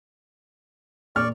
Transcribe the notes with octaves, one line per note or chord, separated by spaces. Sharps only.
A#2 D5 C#6 F6